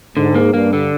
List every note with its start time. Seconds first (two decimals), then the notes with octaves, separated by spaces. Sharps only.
0.17 G#2 D3
0.35 A#3
0.54 G2 A#3
0.73 D3